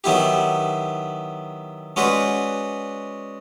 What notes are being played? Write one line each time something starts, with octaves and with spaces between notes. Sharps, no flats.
D#3 F#3 B3 E4 G4
G#3 C#4 F#4 B4 D5